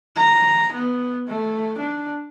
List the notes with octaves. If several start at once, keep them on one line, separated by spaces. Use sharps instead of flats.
A#5
B3
A3
D4